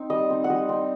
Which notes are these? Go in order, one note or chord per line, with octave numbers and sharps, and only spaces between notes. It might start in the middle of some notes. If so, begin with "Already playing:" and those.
Already playing: C4 D#4
G3 D#5
C4 D#4
F#5
G3 D#5
C4 D#4